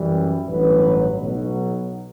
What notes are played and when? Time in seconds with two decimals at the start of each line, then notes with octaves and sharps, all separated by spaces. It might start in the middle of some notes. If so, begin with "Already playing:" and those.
Already playing: F#2 E3 G3
0.47 A1 G2 F#3 B4
1.20 B1 B2 F#3